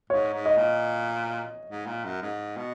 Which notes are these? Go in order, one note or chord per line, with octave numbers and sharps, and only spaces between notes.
G#2 C#5
G#2
D#5
A#2
G#2
A#2
F#2
G#2
B2